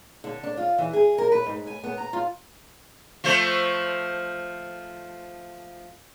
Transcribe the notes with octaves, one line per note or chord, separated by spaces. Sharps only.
D3
D4
F4
E3
G#4
A#4
B4
G#2
G#5
B3
A#5
F4
F3 A3 C5